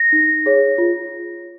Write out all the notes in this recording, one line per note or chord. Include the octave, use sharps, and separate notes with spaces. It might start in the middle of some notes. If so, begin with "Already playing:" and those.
Already playing: A#6
D#4
G#4 C#5
F4